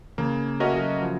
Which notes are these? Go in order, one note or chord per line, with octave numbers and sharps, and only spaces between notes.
C#3 A#3
A3 C#4 F#4 A#4 D#5
F#3
F3